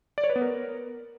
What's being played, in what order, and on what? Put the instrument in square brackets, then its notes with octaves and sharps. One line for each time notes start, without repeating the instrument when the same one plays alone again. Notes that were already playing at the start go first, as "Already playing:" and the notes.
[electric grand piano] D5
C#5
B4
B3
A#4